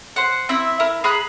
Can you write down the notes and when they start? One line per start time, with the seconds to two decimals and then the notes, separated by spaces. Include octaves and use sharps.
0.16 C5 F#5
0.49 C4 E4 E5
0.80 E4 A#4
1.04 G#4 A#5 B5 F#6